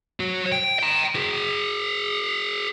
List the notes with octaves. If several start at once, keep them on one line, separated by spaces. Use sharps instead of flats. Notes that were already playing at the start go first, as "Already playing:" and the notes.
F#4 C#5
G5
G5 A#5
F#4 G#4